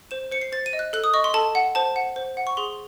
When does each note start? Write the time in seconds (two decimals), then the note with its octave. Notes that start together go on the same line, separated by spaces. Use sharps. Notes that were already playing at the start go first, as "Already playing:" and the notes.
0.11 C5 E7
0.32 C5 C#7
0.42 C7
0.52 C5 A6
0.66 D#7
0.73 D#5
0.79 F#6
0.93 A4 F#6
1.04 D#6
1.14 D#5 C#6
1.24 C6
1.34 A4 A5
1.55 F#5
1.75 C5 A5
1.96 F#5
2.16 C5
2.37 F#5
2.47 C#6
2.57 G#4 C6